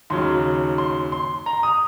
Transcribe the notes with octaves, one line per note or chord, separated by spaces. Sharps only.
D#2 C#3 F#3 C6
C6
C6
A#5
D#6